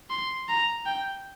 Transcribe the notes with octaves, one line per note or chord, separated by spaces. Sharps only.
C6
A#5
G5